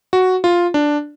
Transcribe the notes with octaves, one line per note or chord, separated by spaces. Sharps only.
F#4
F4
D4